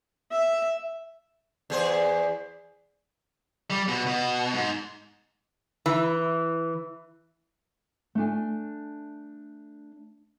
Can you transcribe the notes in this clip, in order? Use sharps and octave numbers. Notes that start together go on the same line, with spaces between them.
E5
E2 G#4 C5
G3
B2
B2
G#2
E3
A3 D4 G#5